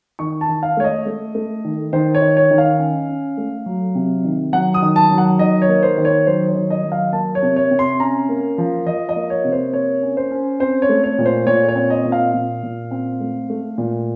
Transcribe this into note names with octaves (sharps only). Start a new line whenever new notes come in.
D#3 C#6
A5
D#3
F5
A3 C#5
D#5
A3
A3
D#3
D#3 C5
C#5
D#3
C#5
D#3
F5
C#4
C#4
A3
F#3
C3
D#3
F#3 F#5
D#6
D#3
A5
F#3
F#5
D#3 D#5
C#5
A#3
C5
D#3
C#5
F#3 C5
C#5
D#3
D#5
F#3
F5
A#3 A5
C#5
C3
C#5
C3
C6
C#4 A#5
A#3
F3
F3 D#5
D#5
A#3
C#5
C3
C5
A#3 C#5
C#4
C5
C#4
C4 C5
C#5
A3
C#5
A#2
C5
A#2 C#5
C#5
C4
D#5
A#2
F5
A#2
A#2
C4
A3
A3
A#2